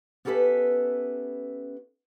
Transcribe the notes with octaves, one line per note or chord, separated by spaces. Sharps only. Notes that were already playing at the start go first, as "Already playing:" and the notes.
B3 C#4 G4 A4 B4 E5